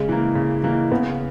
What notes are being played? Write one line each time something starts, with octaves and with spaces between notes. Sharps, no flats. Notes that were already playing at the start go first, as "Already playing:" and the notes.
Already playing: C#3 G#3
E3 A#3
C#3
E3 A#3
C#3 B3